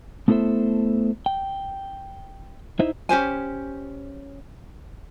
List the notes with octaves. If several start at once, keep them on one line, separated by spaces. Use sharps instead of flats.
A3 B3 E4 A4 C5 E5
G5
D#4 E4 C5 D#5 E5
C#4 G4 C5 G#5